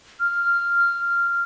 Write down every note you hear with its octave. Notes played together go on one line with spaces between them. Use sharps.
F6